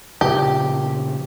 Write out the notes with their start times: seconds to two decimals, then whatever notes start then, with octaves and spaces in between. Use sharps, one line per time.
0.21 A#2 C#3 F3 G4